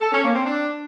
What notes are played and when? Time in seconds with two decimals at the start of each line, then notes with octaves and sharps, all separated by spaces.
0.01 A4
0.12 C#4
0.23 A#3
0.34 C4
0.45 D4